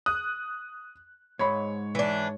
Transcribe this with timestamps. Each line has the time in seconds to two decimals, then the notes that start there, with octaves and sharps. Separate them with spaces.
0.06 D#6 F#6
1.39 G#2 G#3 C#5 B5
1.95 E3 D4